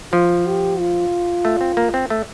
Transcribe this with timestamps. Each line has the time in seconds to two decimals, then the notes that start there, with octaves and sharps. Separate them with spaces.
0.12 F3 F4
0.46 G4
0.79 F4
1.45 A3
1.61 C4
1.77 A#3
1.94 C4
2.10 A3